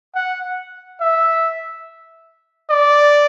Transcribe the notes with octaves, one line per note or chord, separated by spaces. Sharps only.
F#5
E5
D5